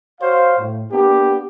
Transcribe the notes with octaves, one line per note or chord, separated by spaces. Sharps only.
F#4 C5 C#5 F5
A2
A#3 B3 D4 G4